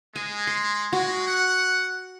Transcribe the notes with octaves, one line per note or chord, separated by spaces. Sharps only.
G#3 G#5
C6
G#3 F#4
F#5